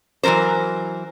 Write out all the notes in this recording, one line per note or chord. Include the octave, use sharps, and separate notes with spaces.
E3 F#3 A#3 A#4 C5